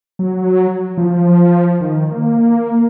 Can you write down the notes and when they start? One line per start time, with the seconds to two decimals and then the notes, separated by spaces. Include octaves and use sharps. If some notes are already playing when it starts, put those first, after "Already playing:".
0.19 F#3
0.97 F3
1.81 D#3
2.11 A#3